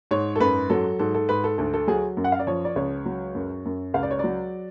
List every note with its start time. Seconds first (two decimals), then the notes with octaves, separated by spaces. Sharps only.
0.11 G#2 C#5
0.36 A4
0.40 F#2 B4
0.70 F#3 A4
0.99 G#2 A4
1.14 A4
1.29 G#2 B4
1.44 A4
1.58 D2 A4
1.74 A4
1.87 F#3 G#4
2.17 F#2
2.24 F#5
2.32 F5
2.39 D5
2.47 F3 C#5
2.65 D5
2.76 C#2 C#5
3.06 F#3
3.35 F#2
3.65 F#2
3.94 C#2 F5
4.03 D5
4.11 C#5
4.19 F#3 D5